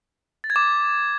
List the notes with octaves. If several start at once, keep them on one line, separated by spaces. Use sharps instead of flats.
A6
G#6
D6